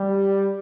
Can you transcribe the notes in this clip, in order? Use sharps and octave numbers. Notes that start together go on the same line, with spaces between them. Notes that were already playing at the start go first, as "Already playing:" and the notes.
Already playing: G3